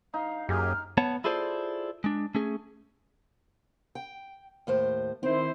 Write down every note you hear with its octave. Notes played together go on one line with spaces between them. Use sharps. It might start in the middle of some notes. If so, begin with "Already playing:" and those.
D#4 F5
F#2 A#3 G4 G#4 F6
B3 C#5 F#5 A5
E4 F4 G#4 A4 C5 D5
G#3 D4
A3 C#4 G#4
G5
D#2 A2 C5
D#3 C4 E4 C5